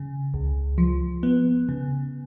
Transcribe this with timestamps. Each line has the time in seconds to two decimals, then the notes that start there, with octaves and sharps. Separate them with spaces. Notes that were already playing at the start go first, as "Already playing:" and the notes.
Already playing: C#3
0.34 C#2
0.78 F3
1.23 B3
1.69 C#3